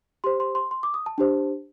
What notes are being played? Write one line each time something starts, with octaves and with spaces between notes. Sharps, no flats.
G4 C5 C6
C6
C6
C6
D6
D#6
A5
D4 G4 C5